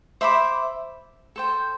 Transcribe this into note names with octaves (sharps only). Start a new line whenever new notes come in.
C5 E5 B5 D6
A4 C5 G5